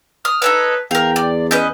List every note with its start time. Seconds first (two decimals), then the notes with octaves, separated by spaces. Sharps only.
0.25 D#6 F6
0.42 D#4 A4 B4 C#5
0.91 E2 A#4 F5 G5
1.16 D5
1.51 C#4 B4 D#5 G6